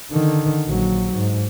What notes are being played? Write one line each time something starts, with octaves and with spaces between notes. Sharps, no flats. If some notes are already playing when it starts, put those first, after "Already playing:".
D3 D#3
A#1 F#3
G#2